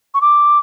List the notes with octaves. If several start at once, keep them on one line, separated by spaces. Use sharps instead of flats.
C#6
D6